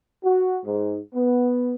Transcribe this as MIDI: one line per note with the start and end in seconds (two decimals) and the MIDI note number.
0.24 0.57 66
0.65 0.97 44
1.14 1.75 59